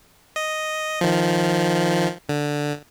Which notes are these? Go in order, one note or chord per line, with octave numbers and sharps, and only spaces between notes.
D#5
D#3 F3
D3